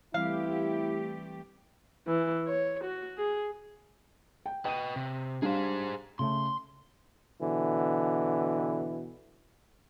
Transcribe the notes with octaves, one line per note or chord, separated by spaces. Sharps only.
E3 G3 A3 C4 E4 G4 F5
E3
C#5
F#4
G#4
G5
B4 D#5 G5 D#6 D#7
C3
G3 D4 G#4 C5 F5
C#3 A3 C6
B2 D3 E3